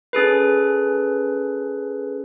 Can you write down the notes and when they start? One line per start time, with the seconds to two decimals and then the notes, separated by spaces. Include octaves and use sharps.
0.13 C#4 G#4 A4 B4